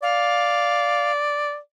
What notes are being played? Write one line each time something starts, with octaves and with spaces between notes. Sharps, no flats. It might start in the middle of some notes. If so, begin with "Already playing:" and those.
D5 F5